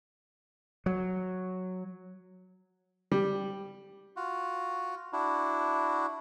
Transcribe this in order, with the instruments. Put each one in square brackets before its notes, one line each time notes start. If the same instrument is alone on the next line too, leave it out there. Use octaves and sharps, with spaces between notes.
[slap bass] F#3
[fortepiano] G3
[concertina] F4 F#4
D4 E4 F#4